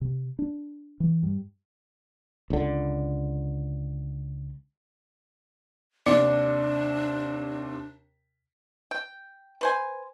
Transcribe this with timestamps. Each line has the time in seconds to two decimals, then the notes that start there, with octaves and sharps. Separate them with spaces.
0.01 C3
0.39 D4
1.00 E3
1.23 G2
2.50 C#2 D3
6.06 D#2 C3 D4 D5 C#7
8.91 G5
9.61 B4 C5 G#5